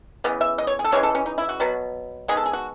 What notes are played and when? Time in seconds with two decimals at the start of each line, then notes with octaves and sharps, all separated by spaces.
0.24 C#3 E3 B3 D#5
0.41 E5
0.58 D#5
0.67 C#5
0.79 G#4
0.84 A4
0.92 C#3 E3 G#3 C#5
1.03 A4
1.15 C#4
1.26 D#4
1.38 E4
1.49 F#4
1.60 B2 F#3 B3
2.28 D#3 G#3 B3 G#4
2.37 A4
2.46 G#4
2.53 F#4